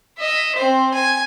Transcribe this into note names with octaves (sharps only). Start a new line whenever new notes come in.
D#5 E5
C4 C5
G#5